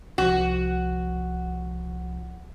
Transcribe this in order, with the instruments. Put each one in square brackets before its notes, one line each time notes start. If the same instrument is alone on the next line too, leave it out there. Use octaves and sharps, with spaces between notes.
[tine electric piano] C2 F3 [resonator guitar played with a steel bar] F#4